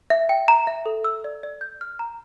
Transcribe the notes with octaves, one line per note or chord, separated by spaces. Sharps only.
E5
G5
A#5
E5
A4
E6
D5
D5
G6
F6
A#5